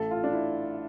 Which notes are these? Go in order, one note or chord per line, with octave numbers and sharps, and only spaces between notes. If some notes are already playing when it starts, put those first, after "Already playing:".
Already playing: A1 A4
F4
D4
E4